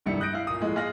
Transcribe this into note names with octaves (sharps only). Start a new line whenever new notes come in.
F1 G2 D#3 G3 E4 C#7
D#6 F#6 G6 A#6 D7
E4 F5
A#2 D#6
A2 F3 G#3
G#3 G#4 F5 F6 A#6 F#7